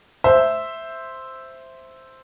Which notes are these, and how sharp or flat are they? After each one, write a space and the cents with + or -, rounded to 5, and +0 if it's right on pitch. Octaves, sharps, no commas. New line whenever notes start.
C5 +0 E5 +0